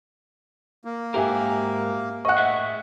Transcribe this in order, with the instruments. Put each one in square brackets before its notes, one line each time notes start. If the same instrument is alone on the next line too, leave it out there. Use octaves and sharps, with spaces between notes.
[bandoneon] A#3
[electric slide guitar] G#2 F#4 A#4 [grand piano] G4 E5 G#5
[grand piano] D#5 F#5 [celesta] C#6 F#6
[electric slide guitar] A2 G#4 E5